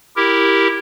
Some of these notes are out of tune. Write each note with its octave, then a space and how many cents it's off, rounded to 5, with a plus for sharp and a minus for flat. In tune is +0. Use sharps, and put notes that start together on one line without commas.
E4 +0 G4 +0 A#4 +0